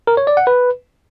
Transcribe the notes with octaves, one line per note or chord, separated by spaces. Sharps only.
A#4
C#5
D5
F#5
B4